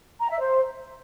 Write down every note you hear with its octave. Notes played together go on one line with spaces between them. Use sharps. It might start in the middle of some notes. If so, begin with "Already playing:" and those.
A#5
E5
C5